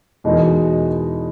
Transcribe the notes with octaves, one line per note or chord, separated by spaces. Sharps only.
E2 B2 G#3 D#4 A#4